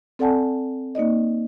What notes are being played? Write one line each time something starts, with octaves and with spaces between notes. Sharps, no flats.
C4 A4 D5 F#5 G#5 A5
A#3 D#4 D5 D#5